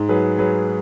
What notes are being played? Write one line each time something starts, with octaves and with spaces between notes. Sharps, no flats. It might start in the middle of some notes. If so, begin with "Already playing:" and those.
Already playing: G#2
F#3 G#4 B4
F#3 G#4 B4